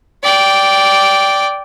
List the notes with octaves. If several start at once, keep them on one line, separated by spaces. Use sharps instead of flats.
D5 G5